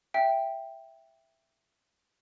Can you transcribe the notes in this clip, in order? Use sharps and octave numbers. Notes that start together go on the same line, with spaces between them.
E5 G5